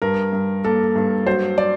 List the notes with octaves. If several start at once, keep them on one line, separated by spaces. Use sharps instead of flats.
G2 A#4
G2
A#3 A4
G2
F#3 C5
D5